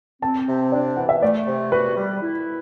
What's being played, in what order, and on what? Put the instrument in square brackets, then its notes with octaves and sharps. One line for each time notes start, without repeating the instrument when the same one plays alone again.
[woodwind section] C4 [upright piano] A5
[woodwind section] C3
[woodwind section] D4 [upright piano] D5
[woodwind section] E3 [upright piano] F#5
[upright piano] E5
[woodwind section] A3 [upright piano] D5
[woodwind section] C3
[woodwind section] F#4 [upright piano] B4
[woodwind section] G3
E4